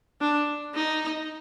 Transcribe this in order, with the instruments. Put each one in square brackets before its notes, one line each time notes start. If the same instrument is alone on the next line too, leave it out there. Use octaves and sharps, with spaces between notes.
[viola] D4
D#4